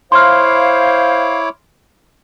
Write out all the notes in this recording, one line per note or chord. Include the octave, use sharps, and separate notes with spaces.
E4 C5 C#5 F5 C6 D6 F6